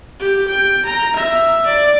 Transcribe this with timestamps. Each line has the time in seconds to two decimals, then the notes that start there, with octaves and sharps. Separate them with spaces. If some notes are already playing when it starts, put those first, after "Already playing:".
0.20 G4
0.48 G5
0.85 A#5
1.16 E5
1.66 D5